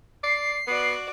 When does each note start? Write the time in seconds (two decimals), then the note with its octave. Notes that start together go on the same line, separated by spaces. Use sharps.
0.24 D5 C7
0.68 B3 F#4 D5